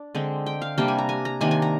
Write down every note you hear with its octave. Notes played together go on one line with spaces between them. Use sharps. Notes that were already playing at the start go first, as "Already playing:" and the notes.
Already playing: D4
D3 G#3 C4
G5
F5
C3 G3 A#3 D4 G5
G#5
A#5
G#5
A#5
C3 D#3 A#3 D4 G#5
G#5
A#5